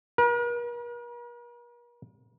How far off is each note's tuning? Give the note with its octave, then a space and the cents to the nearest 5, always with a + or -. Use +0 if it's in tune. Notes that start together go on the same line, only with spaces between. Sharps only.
A#4 +45